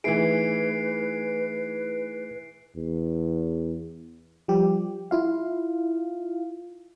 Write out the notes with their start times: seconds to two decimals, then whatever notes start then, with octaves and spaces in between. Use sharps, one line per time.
0.04 E3 A3 D#4 E4 G#4 B4 C7 D7
2.76 E2
4.48 F3 G3 G4
5.11 E4 F4 F5